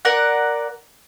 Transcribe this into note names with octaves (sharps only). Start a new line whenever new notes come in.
A#4 D5 F#5